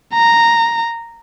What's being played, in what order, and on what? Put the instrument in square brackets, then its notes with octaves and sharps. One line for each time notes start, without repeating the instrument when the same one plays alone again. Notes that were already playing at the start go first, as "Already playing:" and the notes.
[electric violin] A#5